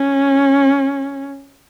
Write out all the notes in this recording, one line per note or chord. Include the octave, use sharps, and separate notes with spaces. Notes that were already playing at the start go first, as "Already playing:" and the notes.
Already playing: C#4